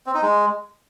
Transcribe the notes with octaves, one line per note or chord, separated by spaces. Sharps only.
C4
D#4
G#3